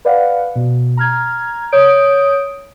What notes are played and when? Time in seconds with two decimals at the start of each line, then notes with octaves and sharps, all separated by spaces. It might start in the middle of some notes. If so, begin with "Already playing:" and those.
0.05 B4 D5 F5 F#5
0.56 B2
0.97 A#5 F6 G#6
1.72 C#5 D#6 G6 D7